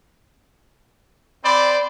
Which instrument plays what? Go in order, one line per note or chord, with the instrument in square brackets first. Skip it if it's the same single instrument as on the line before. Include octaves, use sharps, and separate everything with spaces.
[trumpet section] C4 C5 D5 [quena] B5